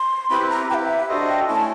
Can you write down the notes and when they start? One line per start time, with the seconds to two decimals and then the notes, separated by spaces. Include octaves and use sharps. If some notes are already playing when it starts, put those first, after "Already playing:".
Already playing: C6
0.30 C4 E4 G4 B4 B5
0.50 A#5
0.69 E4 G4 B4 E5 G5
1.09 D4 F#4 A4 C5 D#5
1.28 G5
1.48 A3 C#4 E4 A5